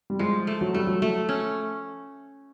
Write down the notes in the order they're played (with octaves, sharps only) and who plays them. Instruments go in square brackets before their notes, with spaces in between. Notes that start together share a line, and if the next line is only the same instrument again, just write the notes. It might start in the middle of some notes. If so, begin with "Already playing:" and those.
[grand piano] G3
[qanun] F3 [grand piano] G#3
[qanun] A3
[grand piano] F#3
[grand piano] G3 [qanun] A3
[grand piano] F#3
[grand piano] F#3 [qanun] A3
[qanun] C#4